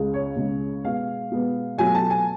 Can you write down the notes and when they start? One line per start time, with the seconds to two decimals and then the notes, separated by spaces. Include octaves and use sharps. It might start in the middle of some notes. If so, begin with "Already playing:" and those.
Already playing: C#2 C#3 G#3
0.14 C#5
0.36 C#2 C#3 G#3
0.84 B2 G#3 B3 F5
1.31 B2 G#3 B3
1.78 B2 F#3 A3 G#5
1.95 A5
2.10 G#5